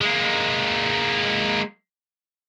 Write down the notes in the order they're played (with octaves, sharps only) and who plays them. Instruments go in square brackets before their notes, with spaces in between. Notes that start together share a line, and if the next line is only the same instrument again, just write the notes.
[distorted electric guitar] G#3 A#3